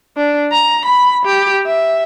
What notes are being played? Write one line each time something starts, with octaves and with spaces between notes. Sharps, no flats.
D4
A#5
B5
G4
E5